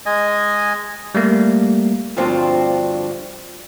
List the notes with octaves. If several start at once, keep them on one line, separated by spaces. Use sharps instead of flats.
G#3 D#5 G#5
G3 A3 A#3
D2 G2 F3 C4 D4